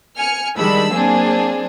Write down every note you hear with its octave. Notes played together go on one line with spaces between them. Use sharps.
G#5 F6 C#7
D#3 G3 G#3 D4 B5 E6
F#3 A#3 C4 D4 G#4